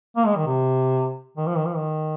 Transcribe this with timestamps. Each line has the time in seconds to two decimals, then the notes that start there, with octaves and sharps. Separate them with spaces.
0.17 A#3
0.26 G#3
0.36 D#3
0.47 C3
1.37 D#3
1.47 F3
1.57 D#3
1.66 F3
1.77 D#3